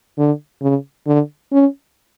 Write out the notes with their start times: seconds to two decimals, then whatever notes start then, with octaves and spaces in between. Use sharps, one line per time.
0.18 D3
0.62 C#3
1.07 D3
1.52 C#4